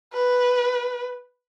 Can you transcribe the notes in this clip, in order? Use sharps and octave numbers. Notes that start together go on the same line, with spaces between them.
B4